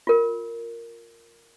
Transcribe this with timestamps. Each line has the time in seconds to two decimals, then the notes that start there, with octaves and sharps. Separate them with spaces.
0.07 F4 A#4